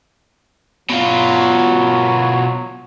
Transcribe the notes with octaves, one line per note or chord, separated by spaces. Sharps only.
B2 F#3 F4